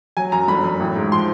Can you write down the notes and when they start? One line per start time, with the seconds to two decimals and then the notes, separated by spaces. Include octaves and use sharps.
0.17 F#3 G#5
0.32 F#2 A#5
0.48 G1 B5
0.64 F#2
0.80 A1
0.96 G#2
1.12 F3 C6